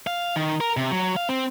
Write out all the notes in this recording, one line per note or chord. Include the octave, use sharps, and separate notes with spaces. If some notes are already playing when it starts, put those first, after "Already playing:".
F5
D#3
A#4
C3
F#3
F5
C4